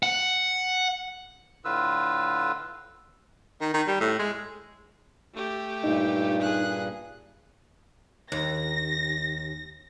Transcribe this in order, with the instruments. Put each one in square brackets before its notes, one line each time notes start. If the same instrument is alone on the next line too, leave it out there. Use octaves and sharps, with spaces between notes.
[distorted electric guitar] F#5
[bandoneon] A2 D3 F4 B4 E6
[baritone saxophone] D#3
D#3
G3
A2
G#3
[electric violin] A3 G4
[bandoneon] G2 A#2 [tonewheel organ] D#4
[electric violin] G#4 F#6
[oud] D#2 [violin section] A#6